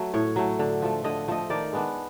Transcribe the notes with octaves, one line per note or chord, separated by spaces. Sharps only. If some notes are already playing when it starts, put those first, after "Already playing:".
Already playing: F#3 A3
A2 C#5
F#3 A3
D3
F3 A3
D3 D#5
F3 A3 D#5
D#3 D5
G#3 B3 D4